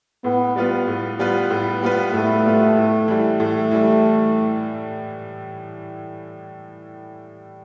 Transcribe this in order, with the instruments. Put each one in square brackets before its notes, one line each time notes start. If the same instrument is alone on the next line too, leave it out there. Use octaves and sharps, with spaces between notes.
[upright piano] A2 [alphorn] B3
[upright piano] G3 B3 F4 B4
A2
G3 B3 F4 B4
A2
G3 B3 F4 B4
[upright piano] A2 [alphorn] A3
[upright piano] G3 B3 F4 B4
A2
E3 G3
[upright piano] A2 [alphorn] A3
[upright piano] E3 G3